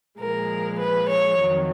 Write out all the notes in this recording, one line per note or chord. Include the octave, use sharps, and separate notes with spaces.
A#2 F3 G#3 A#4
B4
C#5
F2 D#3 F#3